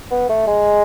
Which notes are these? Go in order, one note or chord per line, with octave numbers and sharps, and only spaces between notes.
B3
A3
G#3